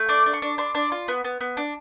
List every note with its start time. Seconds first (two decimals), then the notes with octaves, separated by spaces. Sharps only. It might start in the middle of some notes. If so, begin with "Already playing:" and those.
Already playing: A3
0.09 D4 D6
0.26 D4
0.33 C#6
0.42 D4
0.58 D4 C6
0.75 D4
0.92 F4
1.08 B3
1.24 B3
1.40 B3
1.57 D4